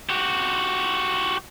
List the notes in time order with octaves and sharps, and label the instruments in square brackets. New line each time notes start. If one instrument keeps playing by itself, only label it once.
[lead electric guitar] F#4 G4